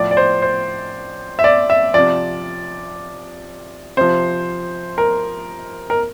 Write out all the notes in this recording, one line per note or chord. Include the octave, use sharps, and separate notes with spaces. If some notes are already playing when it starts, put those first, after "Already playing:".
Already playing: A2 F3 D5
D5
C5
C5
E5
D5
E5
C3 F3 D5
C3 F3 C5
A#4
A#4